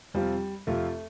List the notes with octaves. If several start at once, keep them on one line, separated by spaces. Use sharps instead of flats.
F2 C3 F3 G3 C4 F4
F2 C3 F3 A3 C4 F4